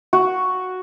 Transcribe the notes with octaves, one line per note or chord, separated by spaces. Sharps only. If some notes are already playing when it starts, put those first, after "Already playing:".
F#4